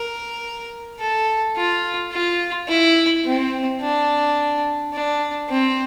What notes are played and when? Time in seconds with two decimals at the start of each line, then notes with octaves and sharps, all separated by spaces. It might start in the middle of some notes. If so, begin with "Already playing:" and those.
Already playing: A#4
1.00 A4
1.57 F4
2.13 F4
2.69 E4
3.25 C4
3.81 D4
4.94 D4
5.49 C4